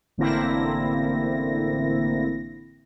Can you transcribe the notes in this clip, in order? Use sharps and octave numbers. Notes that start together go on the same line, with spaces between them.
A1 D3 A#3 C4 E4 A#6